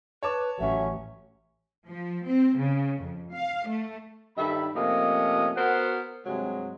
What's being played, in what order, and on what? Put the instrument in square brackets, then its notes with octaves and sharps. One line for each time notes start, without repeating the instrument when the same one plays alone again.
[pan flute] B4 [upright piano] C#5 A5 D6
[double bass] A1 [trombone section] F#3 A3 C#4 [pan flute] E5
[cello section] F3
C4
C#3
F2
F5
A3
[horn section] G2 D#3 A4 E5 B5
C3 F3 A3 A#3 C#4 D#5
B3 F#4 A#4 C5 F#5
G2 C3 F#3 G#3